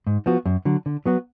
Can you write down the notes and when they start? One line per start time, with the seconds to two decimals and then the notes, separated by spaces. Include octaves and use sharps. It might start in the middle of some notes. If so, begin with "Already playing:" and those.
0.07 G#2
0.26 F3 B3 F#4
0.46 F#2
0.65 D3 F#3
0.86 D3
1.06 F#3 B3 F#4